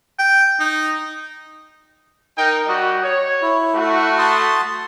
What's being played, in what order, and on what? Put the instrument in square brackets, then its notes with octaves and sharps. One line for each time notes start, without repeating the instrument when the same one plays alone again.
[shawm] G5
D#4
[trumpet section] D#4 A#4 G5
G3 F#4 D#5
C#5
[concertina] E4
[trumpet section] A3 F#4
[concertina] A5 C6 D#6